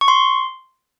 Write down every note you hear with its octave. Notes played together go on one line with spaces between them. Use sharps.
C#6
C6